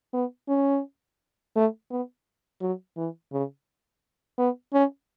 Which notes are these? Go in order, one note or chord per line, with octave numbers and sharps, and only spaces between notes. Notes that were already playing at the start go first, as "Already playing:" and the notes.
B3
C#4
A3
B3
F#3
E3
C#3
B3
C#4